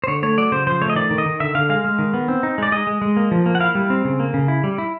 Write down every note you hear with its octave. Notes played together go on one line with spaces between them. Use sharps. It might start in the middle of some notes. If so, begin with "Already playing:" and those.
C5
D3 C#5
A3 C#5
F#3 D5
C#3 C5
F3 C5
A3 C#5
D#5
D#3 D5
D#3
D#5
D#3
D3 E5
D3 F5
G#3 F5
G#3
D#3
B3
C4
D#4
G#3 D5
G#3 D#5
G#3
G#3
A#3
F3
A#3
F#5
E4 F5
G3
C4
C#3
A#3
C#3
E4
G3
E4